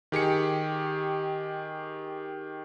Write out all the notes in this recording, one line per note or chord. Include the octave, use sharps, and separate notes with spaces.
D#3 G4 G#4 C#7